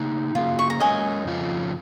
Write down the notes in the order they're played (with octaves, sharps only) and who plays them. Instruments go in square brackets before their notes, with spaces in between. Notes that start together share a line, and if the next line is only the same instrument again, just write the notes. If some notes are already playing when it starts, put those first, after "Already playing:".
Already playing: [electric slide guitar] C#3 A#3 D#4
[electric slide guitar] C#3 A#3 C#4 G#4 [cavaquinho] F4
[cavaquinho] C#6
A#5
[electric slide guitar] G#3 C#4 A#4 C#5 [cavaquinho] D#5 G#5
[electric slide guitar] F2 C#3 F3 C#4 F4